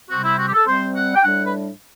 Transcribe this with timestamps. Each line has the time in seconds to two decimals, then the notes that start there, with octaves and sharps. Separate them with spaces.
0.10 C3 G3 C4 F#4
0.24 E4
0.38 F#4
0.48 G4
0.53 A4
0.66 C3 G3 C4 C5
0.95 F#5
1.15 G5
1.24 A2 G3 D4 F#5
1.46 B4